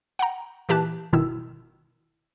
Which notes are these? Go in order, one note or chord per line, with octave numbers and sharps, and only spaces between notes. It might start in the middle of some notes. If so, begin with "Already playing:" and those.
F#5 G5 A#5
A#2 E3 G4 A5 F#6
G1 B2 D#3 E4 E6